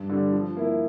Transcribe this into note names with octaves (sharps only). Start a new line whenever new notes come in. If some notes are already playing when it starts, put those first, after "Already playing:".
Already playing: G2
D3 G3
F3
A#3 E4